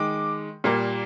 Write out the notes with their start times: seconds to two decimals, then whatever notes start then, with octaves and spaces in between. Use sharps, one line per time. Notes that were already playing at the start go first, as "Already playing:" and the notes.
Already playing: D#3 G#3 D6
0.64 A#2 G3 A#3